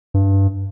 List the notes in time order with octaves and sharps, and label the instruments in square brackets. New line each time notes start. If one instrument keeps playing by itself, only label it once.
[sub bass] G2